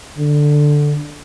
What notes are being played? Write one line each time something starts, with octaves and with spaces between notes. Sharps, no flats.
D3